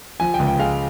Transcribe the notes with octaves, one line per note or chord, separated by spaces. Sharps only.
F3 G#5
G5
C#2
G5
G#3 F5